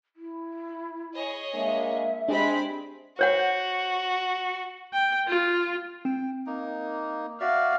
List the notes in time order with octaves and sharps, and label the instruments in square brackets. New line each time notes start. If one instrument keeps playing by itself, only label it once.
[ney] E4
[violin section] G#4 C#5 D#5
[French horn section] G#3 A#3 D4 [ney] E5
[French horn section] G#3 [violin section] C4 B5 B6 [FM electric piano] D4 G4
[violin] F#4 [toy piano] C5 C#5 F#5
[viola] G5
F4
[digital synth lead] C4 [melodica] G5
[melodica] A#3 D#4
[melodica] F#4 D5 [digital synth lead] E5 [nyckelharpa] F5